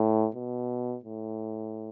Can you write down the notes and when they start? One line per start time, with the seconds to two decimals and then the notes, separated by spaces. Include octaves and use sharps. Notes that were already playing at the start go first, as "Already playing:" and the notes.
Already playing: A2
0.35 B2
1.04 A2